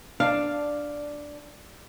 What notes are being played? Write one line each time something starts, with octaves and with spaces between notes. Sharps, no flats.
D4 F5